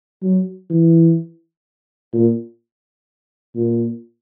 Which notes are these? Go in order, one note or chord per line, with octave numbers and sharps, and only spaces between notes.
F#3
E3
A#2
A#2